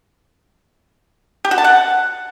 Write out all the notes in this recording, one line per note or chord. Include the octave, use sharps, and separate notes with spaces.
G4
F#4
A5
F#5